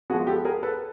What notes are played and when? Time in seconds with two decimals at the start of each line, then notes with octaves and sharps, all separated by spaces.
0.10 F3 G#3 B3 F#4 G#4
0.27 G4 A4
0.45 G#4 A#4
0.63 A4 B4